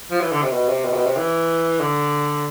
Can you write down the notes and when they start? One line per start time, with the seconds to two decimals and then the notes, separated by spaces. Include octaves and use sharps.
0.11 F3
0.21 E3
0.32 D3
0.42 C3
0.53 B2
0.69 C3
0.85 B2
0.91 C3
0.95 B2
1.06 C3
1.17 E3
1.80 D3